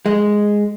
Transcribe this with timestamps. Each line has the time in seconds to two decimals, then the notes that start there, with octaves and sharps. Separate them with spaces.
0.06 G#3